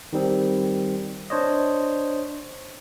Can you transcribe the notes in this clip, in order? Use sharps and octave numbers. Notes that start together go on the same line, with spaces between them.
D#3 G3 C4
D4 C5 C#5 D#5